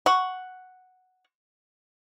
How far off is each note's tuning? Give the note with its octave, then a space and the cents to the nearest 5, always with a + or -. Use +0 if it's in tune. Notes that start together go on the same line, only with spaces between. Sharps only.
F#5 +0 C#6 +0